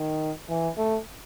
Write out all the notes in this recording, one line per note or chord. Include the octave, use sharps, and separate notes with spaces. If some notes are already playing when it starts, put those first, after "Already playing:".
Already playing: D#3
E3
A3